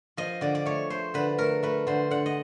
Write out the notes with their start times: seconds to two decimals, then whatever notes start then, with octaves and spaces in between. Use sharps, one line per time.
0.17 F3 D#5
0.41 D3 D5
0.55 D5
0.66 A3 C#5
0.90 A3 C5
1.14 D3 B4
1.38 A3 A#4
1.63 A3 B4
1.87 D3 C5
2.11 D3 F#5
2.26 D#5